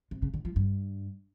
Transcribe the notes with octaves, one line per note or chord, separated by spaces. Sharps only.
C3
C#3
D3
F3
G2